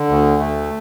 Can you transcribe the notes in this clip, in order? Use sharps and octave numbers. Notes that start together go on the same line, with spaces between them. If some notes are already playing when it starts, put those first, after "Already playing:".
Already playing: D3
D2
A3